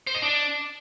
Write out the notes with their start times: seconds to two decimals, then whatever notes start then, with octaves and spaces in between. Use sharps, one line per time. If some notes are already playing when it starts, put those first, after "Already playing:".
0.07 C5
0.15 D#5
0.22 D4